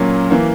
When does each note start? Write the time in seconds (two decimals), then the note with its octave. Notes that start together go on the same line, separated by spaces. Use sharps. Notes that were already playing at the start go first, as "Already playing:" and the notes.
Already playing: A#2 F#3 A#3 C#4
0.30 E3 A#3